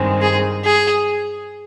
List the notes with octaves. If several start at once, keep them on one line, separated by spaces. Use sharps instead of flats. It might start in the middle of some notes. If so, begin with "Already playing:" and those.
Already playing: G2 D#3 G#3 C4
G#4
G#4